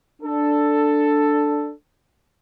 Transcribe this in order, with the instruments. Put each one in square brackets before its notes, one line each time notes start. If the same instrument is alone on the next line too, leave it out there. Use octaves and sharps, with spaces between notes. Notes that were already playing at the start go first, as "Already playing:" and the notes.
[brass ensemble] D4 A4